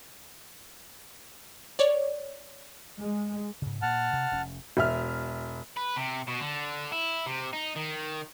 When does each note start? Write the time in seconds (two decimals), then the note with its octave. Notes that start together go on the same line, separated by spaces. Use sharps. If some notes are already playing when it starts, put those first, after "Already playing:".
1.79 C#5 D5
3.01 G#3
3.62 G#2 C#3
3.82 A#2 A#3 F#5 A5 F6
4.13 C3
4.31 F1 C#4
4.77 E1 E5 F6
5.77 B4
5.96 C3
6.27 B2
6.40 D3
6.92 E4
7.26 C3
7.53 D#4
7.76 D#3